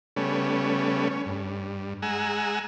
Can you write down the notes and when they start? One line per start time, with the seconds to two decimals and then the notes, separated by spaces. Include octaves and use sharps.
0.16 C#3 G3 A3 B3 C#4
1.10 C#4
1.26 G2
2.02 G#3 F#5 G#5 A#5 E6